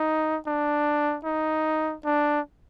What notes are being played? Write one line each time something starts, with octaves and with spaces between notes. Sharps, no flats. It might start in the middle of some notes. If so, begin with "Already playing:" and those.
Already playing: D#4
D4
D#4
D4